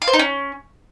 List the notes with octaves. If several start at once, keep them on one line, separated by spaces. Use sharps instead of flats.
F5
C5
D#4
C#4